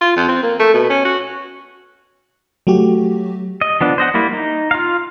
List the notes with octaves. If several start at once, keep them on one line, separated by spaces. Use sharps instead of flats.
F4
F2
C4
A#3
A3
B2
C#4
F#4
F#3 A3 F#4 G4
D#5
F3 B3 D4
C5 D#5 F#5
G3 A#3 E4
D#4
F4 F5